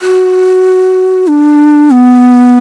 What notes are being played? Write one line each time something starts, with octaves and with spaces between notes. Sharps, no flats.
F#4
D4
B3